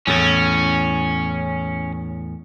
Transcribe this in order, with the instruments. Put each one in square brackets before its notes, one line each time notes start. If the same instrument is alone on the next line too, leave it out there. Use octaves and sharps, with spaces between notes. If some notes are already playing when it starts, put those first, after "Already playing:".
[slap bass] E2 A2 [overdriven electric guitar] C#4